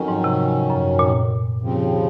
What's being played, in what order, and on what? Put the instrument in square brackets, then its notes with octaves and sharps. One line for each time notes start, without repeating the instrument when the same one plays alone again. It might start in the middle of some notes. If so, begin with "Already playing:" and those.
Already playing: [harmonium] F2 D#3 F#3 C#4
[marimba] G#2
C3
F#2
A#2
[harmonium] D#2 C#3 F3 C4